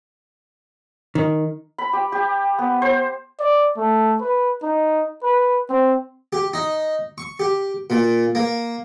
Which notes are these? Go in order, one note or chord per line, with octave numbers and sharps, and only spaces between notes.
D#3
B5
G4
G4
B3
C5
D5
A3
B4
D#4
B4
C4
G4
D#4
C#6
G4
A#2
A#3